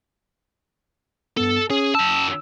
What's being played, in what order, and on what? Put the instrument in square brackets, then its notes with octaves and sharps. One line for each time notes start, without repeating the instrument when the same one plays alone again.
[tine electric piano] G2 B3 [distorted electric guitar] A4
[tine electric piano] C#4 [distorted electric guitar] G#4
[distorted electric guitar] F#2 A5 [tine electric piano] E6